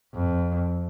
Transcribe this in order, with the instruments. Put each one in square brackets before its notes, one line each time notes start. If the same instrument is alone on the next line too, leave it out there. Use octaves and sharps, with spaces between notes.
[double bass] F2